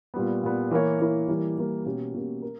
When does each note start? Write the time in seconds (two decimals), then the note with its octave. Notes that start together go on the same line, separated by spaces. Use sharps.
0.14 A#2 G3 B3
0.43 A#2 G3 B3
0.71 E3 A#3 E4 A#4 C#5
1.00 E3 A#3 E4 A#4 C#5
1.28 E3 G3 A#3
1.58 E3 G3 A#3
1.85 B2 A#3 C#4 G4
2.14 B2 A#3 C#4 G4
2.42 A#4